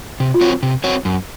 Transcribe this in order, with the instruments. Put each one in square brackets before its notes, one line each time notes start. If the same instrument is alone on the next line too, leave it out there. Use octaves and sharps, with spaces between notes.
[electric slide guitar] C3
[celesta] F4
[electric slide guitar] F#3 C4 F#4 C#5
C3
F#3 C4 F#4 C#5
F#2